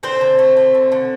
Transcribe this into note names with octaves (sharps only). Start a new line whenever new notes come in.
D3 C4 C5
D3
A3
A3
D3
D3